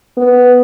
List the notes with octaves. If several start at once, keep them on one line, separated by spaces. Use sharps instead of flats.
B3